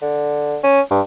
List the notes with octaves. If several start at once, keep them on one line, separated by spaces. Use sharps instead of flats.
D3
C#4
G2